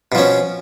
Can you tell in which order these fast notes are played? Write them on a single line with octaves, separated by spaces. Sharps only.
B2 F3 C#4